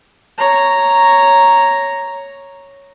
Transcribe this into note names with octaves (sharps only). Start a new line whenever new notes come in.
C#5 A#5